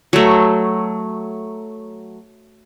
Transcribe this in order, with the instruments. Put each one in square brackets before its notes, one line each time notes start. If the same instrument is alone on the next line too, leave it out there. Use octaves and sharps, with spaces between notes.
[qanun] F#3 A3